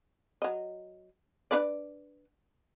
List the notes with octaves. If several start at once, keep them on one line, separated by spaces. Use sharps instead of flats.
F#3 D#5
D4 B4 D5